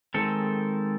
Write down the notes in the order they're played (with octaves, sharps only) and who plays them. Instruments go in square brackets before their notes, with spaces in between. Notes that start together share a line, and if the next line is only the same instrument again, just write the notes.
[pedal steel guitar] D#3 G#3 C4 A4